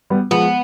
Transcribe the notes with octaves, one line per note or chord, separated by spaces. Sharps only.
G3 B3
F3 G#3 B3